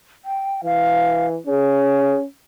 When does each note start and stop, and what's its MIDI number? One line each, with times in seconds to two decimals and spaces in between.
0.25 0.62 79
0.64 1.37 52
0.64 1.27 77
1.47 2.25 61
1.47 2.16 68